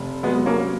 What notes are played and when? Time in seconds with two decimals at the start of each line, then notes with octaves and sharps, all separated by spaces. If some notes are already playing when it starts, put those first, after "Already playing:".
Already playing: F1
0.23 F#3 G#3 B3
0.46 A#3 C#4